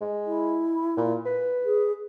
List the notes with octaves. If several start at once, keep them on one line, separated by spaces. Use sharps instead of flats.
G#3
E4
A#2
B4
G#4